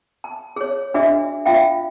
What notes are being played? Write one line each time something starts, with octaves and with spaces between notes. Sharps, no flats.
A5
G#4 C#5
D4 F#4 G#4 D#5 E5
F4 E5 F5 G5